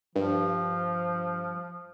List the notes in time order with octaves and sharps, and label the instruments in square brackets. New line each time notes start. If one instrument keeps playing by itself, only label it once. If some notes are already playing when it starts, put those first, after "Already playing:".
[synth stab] G2 [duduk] F3